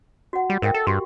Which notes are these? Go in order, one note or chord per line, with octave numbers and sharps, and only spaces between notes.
F#4 F#5
G3
G#2 A#4 E5 G5
A4
G2 F#4 G4 C6